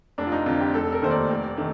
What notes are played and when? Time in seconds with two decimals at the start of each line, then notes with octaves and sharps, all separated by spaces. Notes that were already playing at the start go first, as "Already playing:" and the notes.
0.18 F1 D4
0.27 F4
0.32 D#4
0.46 F2 D3 F4
0.60 G4
0.73 F1 A4
0.83 A4
0.93 A#4
1.02 D#2 D#3 A3 C5
1.11 D5
1.29 F1
1.57 D#3 A3